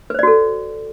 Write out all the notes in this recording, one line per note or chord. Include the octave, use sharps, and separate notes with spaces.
F#4 A4 B4 C5 D5